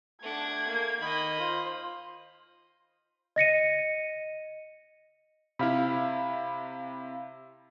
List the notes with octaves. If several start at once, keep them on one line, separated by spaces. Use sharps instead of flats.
A3 D4 F#5 G#6
A#3
D#3 D#5 B5
F4 C5
D#5 A#6 C#7 D#7
C3 E4 F5 B5